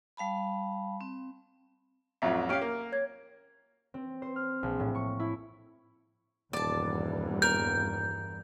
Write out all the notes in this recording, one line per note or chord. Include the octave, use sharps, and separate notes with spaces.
G3 F5 A5 B5
C4
A1 F2 F#3 F4 E5
C#4 G4 F5 F6 D7
A#3
C#5 G#6
C4
C5
F6
A#1
A2
C#6
E4
D#1 E2 G2 D5 A5
A#4 G6